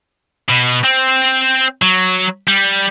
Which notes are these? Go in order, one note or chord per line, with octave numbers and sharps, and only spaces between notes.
B2
C4
F#3
G3